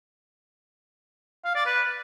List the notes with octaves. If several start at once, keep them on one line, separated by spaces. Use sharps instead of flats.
F5
D5
B4